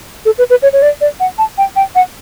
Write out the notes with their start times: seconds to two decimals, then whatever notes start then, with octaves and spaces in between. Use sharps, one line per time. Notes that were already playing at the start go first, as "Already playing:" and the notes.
0.25 A4
0.38 B4
0.50 B4
0.63 C#5
0.73 C#5
0.82 D5
1.01 D5
1.20 F#5
1.38 A5
1.58 G5
1.76 G5
1.95 F#5